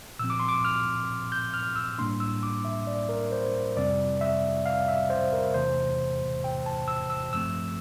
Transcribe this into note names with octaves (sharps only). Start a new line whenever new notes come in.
A#2 F3 C4 E6
D6
C6
D6
F6
G6
F6
E6
A2 G3 A#3 D4 C6
E6
D6
E5
D5
A#4
C5
F2 C3 G3 C4 D5
E5
F5
E5
C5
A#4
E2 C3 E3 A3 C5
G5
A5
E6
E6
G2 F3 A3 C4 E6